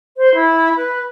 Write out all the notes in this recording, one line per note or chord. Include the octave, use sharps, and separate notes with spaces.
C5
E4
B4